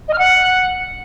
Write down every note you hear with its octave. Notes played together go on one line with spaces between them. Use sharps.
D#5
F6
F#5